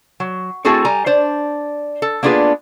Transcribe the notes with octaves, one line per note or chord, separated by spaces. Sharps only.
F#3
A3 C4 E4 F#4 G#4 A4
G3 G#5 A#5
D4 C5 D5
A4
A#3 B3 D4 F4 G#4 B4